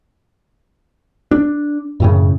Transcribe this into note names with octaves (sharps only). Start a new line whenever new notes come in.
D4
F#2 A2 C#3